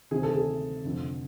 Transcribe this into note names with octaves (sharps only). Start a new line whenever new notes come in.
D2 C3 D#3 G#4
A4
G#4
F1 F2 D3